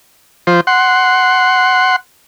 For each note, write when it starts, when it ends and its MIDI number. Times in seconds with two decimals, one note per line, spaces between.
0.47 0.61 53
0.47 0.61 72
0.67 1.96 78
0.67 1.96 84